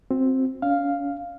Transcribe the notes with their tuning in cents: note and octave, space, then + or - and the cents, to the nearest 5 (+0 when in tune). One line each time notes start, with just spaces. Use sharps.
C4 +5 F#4 -30
C#4 +45 F5 +0